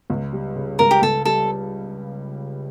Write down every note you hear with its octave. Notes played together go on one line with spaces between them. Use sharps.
C#2
G3
C#3
C#2 A#4
G4
C#2 A4
G3 A4